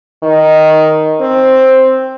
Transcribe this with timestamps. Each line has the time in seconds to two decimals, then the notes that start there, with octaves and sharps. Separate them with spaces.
0.23 D#3
1.20 C4